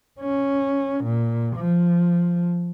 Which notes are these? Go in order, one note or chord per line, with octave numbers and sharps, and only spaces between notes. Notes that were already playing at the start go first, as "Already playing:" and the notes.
C#4
A#2
F3